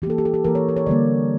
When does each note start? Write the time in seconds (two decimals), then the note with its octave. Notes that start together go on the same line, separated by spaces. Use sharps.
0.02 E3 G4
0.07 A#3 A4
0.18 G4
0.25 A4
0.34 G4
0.44 E3 A#3 A#4
0.55 C#5
0.69 A#4
0.77 C#5
0.86 D3 G3 A#3 D5